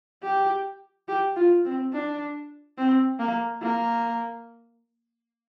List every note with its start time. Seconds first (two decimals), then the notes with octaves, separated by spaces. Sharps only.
0.23 G4
1.08 G4
1.36 F4
1.65 C4
1.93 D4
2.78 C4
3.19 A#3
3.62 A#3